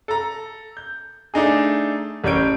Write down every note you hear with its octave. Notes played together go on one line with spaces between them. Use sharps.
A4 A#5
G6
A3 D4 D#4 G#4
A1 G3 C#5 G6 D7